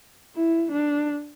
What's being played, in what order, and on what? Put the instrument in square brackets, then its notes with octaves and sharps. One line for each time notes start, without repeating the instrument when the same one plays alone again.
[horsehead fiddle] E4
D4